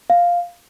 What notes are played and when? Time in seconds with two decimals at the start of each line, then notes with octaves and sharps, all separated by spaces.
0.10 F5